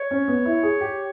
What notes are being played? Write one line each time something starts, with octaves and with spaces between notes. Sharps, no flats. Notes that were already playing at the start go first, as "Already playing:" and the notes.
Already playing: C#5
C#4
B3
E4
G#4
G4